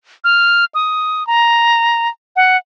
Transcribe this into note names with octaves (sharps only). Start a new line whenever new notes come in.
F6
D#6
A#5
F#5